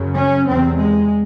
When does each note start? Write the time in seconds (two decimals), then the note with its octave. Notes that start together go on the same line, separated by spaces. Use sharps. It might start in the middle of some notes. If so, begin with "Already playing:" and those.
Already playing: F#2 C#3
0.15 C#4
0.46 E2 C3 C4
0.78 G#3